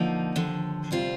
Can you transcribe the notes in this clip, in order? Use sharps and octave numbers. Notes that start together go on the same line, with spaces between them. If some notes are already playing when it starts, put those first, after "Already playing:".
Already playing: D3 F3 A#3 D#4
D#2 D3 F3
D2 C3 G3 C4 F4